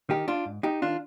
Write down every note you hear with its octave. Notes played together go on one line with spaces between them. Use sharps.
D#3 D#4 G4
D4 F4
G#2
D#4 G4
D#3 D4 F4